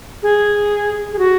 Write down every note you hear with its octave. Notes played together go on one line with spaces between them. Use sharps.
G#4
G#4
F#4